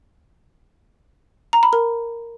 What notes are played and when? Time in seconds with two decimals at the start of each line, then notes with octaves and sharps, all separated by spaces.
1.53 A#5
1.63 B5
1.73 A#4